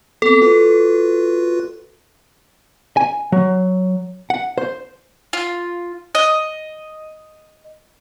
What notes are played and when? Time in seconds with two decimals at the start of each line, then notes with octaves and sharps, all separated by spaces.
0.22 B3 C4 A4
0.42 F4 F#4 B4
2.97 G#5
3.32 F#3
4.30 F#5
4.58 C5
5.33 F4
6.15 D#5